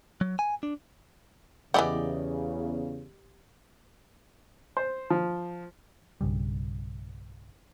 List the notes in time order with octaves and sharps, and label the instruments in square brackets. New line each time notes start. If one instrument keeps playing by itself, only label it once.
[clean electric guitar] F#3
G#5
D4
[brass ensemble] E2 C#3 [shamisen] E3 E4 F#5 [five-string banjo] G4 D5 D#5
[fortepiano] C5
F3
[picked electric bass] B1 G2 C#3 G3